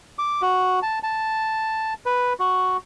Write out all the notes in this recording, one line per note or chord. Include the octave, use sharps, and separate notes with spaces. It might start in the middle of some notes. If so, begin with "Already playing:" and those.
D6
F#4
A5
A5
B4
F#4